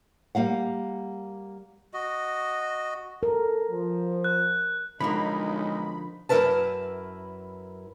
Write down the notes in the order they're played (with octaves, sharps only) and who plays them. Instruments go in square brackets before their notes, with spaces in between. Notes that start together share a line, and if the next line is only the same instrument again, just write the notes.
[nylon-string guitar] G3 A#3 F5 F#5
[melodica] F#4 D#5
[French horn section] A4 [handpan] A#4
[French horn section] F3
[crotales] F#6
[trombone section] B1 D#4 [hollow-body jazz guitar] D3 F3 A#3 [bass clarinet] G#3 [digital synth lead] B5
[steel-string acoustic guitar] F#2 E3 E4 A#4 B4 A5